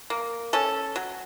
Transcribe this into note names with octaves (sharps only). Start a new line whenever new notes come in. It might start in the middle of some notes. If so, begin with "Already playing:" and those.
A#3
C#4 A4
F#3